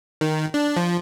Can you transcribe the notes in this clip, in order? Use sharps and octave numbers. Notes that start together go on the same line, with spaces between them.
D#3
D4
F3